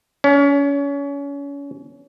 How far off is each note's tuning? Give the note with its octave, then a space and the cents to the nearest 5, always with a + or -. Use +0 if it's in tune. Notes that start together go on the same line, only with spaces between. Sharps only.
C#4 +30